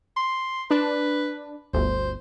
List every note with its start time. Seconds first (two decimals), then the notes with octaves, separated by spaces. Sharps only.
0.17 C6
0.71 D4 B4
1.74 G1 D2 C5